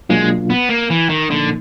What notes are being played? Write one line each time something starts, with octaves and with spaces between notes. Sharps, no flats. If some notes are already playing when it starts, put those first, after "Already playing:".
B2 F#3 G#3 A#3 D4 F4
B3
A#3
E3
D#3
A#2 D3 F3 A#3 D#4